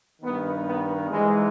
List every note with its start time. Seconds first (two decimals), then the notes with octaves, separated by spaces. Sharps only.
0.22 G2 D#3 B3
0.66 B3
1.10 G#2 E3 G#3